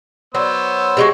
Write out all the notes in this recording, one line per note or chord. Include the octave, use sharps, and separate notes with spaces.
F#3 B3 C5 E6
C3 G#3 F#4